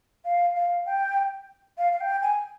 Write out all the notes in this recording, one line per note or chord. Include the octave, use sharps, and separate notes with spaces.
F5
F5
G5
F5
F5
G5
G#5